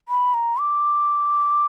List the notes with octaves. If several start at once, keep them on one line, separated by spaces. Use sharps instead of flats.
B5
A#5
D6